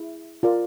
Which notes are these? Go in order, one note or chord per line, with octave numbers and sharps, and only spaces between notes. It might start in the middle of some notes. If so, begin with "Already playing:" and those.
Already playing: E4 G#4 E5
F4 A#4 D5